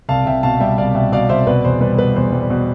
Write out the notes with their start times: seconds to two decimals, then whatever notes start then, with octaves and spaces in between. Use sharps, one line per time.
0.09 C2 F5 A5
0.26 C2 E5 G5
0.43 B2 F5 A5
0.60 G3 E5 G5
0.78 C2 D5 F5
0.95 B2 E5 G5
1.12 B2 D5 F5
1.29 C2 C5 E5
1.47 B2 B4 D5
1.64 E2 C5
1.81 G3 B4
1.98 B2 B4
2.16 E2 C5
2.32 G3
2.50 B2